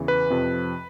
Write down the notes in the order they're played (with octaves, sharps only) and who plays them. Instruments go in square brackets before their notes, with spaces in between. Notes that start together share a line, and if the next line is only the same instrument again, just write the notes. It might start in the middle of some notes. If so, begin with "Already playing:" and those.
Already playing: [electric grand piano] E2 C#3 E3
B4
F2 C3 F3